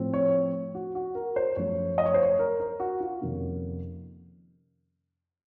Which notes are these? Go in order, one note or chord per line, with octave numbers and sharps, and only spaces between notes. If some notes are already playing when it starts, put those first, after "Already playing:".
Already playing: A2 F3 C4
C#5
F#4
F#4
A#4
C5
F#2 F3 A3 C#4 C#5
D#5
C#5
C5
C#5
A#4
A#4
F#4
F4
F2 C3 D#3 A#3 C#4